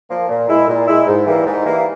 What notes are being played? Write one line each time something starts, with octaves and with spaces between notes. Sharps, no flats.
F3 A#3
A#2
G#3 E4
A#2
G#3 E4
G#2
E3 G3 A#3
G#2
E3 G3 A#3